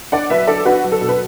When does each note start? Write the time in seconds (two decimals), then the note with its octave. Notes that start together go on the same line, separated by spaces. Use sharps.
0.12 D4 D5 F#5
0.30 F#3 B4 E5
0.48 D4 A4 D5
0.65 D4 F#4 B4
0.84 F#3
0.92 A4
1.01 B2
1.09 B4